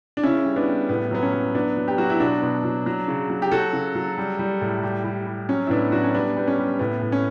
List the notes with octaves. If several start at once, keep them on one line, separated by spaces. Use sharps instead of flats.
D4
C#3 C#4 E4
G3
B3 D4
G3
A2 B3
F#3 B3
C#4
F#3
F#3 B3 D4
F#3
G4
F#3 F#4
E4
B2 D4 F#4
B2
F#3
F#3
C#3
F#3
G4
F#3 F#4 A4
C#3
F#3
G3
G3
A2
G3
G3
G3
F#3 C#4
E4
A2 B3 D4
F#3 D4 F#4
C#4
G3 B3 D4
G3 B3
C#4
G3
A2 B3
A2
C#4